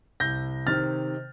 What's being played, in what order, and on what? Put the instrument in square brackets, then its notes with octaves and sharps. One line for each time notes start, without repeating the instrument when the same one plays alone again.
[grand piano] C2 G6 A#6
C3 D#3 F6 A6